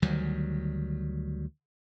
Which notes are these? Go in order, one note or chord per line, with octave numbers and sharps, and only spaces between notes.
D2 D#3 F#3 G3